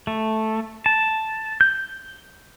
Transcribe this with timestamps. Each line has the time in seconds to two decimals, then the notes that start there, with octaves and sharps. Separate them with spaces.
0.07 A3
0.86 A5
1.61 G6